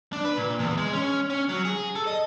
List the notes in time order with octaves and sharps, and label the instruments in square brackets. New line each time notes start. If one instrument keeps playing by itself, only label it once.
[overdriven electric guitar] D4
B4
A#2
E2
G#3
C#4
C#4
F#3
G#4
A4
D#5